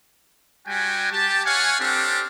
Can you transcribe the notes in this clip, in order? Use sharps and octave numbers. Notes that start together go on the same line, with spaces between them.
G3 F#4 G5 G#5
G4 A5
C#5 F5 F#5 G#5
C4 D4 G4 A4 F5